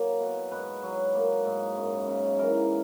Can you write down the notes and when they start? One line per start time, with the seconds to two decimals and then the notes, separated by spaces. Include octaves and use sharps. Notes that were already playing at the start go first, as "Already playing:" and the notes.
Already playing: F#3 A#3
0.20 B2
0.51 G#2 B4
0.83 F#3
1.14 A#3
1.45 G#2
1.76 F#2
2.07 C#3
2.38 E3 A#4